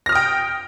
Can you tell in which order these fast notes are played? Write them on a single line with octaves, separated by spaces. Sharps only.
A#6 F6 D#6 G5